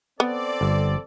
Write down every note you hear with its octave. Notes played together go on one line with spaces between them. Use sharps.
B3 C4 A4 D5
G1